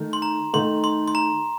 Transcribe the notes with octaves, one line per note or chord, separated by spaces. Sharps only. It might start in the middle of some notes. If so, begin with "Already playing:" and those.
Already playing: D#3 A3 D#4
C6
A#5
D#3 A3 D#4 C6
C6
C6
A#5